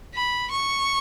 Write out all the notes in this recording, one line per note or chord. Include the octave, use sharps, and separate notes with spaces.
B5
C#6